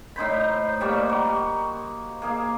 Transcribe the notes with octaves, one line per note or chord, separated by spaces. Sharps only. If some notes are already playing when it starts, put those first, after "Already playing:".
A2 D#4 C5 B5
G3 A#3 F#4
F#4
A#3 G#4 F5